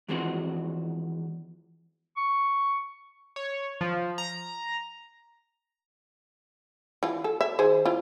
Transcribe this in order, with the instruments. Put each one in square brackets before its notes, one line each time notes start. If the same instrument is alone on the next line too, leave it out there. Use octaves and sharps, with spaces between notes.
[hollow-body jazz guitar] E2 E3 F3 G#3 C4 F#4
[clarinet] C#6
[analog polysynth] C#5
F3
A#5
[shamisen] E3 F4
A4
E5
D#3 G#4 C5
E4 F4